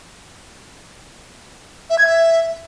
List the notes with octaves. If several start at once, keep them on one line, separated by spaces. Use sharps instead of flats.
E5
G#6
E5